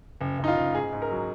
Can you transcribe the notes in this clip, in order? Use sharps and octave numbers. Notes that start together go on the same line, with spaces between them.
F#1
F#1 D#4
F4
F#1
G#2 G#4
G#2
A#4
F#3